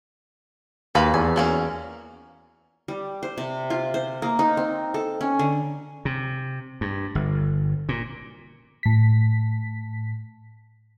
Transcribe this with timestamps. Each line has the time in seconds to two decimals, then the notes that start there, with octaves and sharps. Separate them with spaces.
0.95 D#2 F#4 B4 F5
1.14 E2 G#5
1.36 F#3 A#3 C#4
2.88 G3
3.23 C5
3.38 C3
3.70 F4
3.94 C5
4.22 A#3
4.39 D#4
4.57 C4
4.94 A4
5.21 C#4
5.39 D3
6.05 C3
6.81 G2
7.15 G1
7.89 A#2
8.83 A2 B6